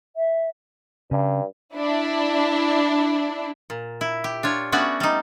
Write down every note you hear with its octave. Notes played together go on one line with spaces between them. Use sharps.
E5
G2 C#3
D4 E4
A#2
E4
G4
D4 F4 C#5
A3 B3 C#4 D4 F#4 D5
G3 D#4